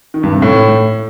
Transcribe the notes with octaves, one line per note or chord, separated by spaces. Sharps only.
D#3
G2
C3
A2